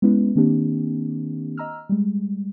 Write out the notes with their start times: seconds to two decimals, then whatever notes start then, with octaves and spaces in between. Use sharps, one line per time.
0.02 G#3 B3 C#4 E4 B4
0.36 D#3 A#3 C4 D4 G4
1.57 D#5 A#5 E6 F6
1.89 G3 G#3